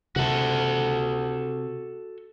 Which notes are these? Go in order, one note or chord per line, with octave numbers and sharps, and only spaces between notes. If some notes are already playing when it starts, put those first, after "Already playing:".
C3 F#4 A4